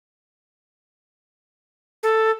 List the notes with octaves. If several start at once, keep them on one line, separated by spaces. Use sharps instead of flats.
A4